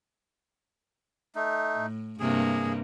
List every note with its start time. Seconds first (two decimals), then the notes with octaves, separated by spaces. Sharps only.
1.35 A3 D#4
1.76 A2
2.20 G2 C3 A#3 G#4